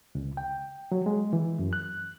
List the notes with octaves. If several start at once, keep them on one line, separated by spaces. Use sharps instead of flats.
C#2
G5
F#3
G#3
E3
F#2
F#6